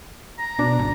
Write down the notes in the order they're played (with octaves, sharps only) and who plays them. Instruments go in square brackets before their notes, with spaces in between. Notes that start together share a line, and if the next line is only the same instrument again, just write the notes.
[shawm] A#5
[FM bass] B2 [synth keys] D4
[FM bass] G#1